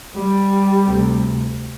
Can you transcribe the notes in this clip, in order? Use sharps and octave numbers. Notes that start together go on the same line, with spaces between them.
G3
D2 C3